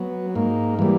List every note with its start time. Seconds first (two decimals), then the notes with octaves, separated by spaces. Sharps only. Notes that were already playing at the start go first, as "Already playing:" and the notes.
Already playing: F#3 B3
0.35 G#2 A#3
0.79 E3 G3 A#3